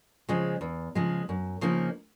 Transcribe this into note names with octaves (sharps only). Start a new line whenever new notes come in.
C#3 F3 G#3
E2
C#3 F3 G#3
F#2
C#3 F3 A#3 D#4